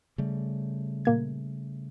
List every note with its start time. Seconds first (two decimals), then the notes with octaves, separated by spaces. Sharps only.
0.18 C#3 G3 A3
1.05 A#2 A#3 G#6